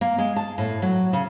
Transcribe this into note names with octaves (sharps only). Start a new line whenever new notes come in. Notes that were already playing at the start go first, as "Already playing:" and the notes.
A#3
G#3
A5
A2
F#3
C#3